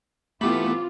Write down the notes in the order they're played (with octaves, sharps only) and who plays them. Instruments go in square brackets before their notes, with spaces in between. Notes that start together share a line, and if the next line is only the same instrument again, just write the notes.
[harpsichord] E3 G4 B5 [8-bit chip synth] A3 B3 [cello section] C4 F4 [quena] D6